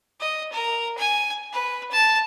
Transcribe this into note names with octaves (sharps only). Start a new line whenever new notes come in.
D#5
A#4
G#5
B4
A5